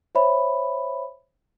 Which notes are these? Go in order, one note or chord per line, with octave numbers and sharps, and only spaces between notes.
C5 C#5 E5 B5